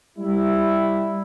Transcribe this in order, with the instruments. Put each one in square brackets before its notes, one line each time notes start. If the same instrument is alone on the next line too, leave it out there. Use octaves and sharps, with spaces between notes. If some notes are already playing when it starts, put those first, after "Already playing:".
[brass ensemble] G3 E4